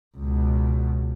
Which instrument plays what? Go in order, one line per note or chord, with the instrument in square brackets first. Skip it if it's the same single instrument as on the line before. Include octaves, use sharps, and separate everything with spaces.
[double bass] C#2 B2